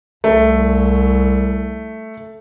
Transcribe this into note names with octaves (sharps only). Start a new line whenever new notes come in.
C2 A3